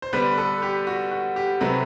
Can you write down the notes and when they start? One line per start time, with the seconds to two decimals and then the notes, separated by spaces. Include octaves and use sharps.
0.02 C5
0.13 D3 G3 B3 B4
0.38 A4
0.62 G4
0.87 F#4
1.11 F#4
1.36 G4
1.61 C3 F#3 A3 C4 B4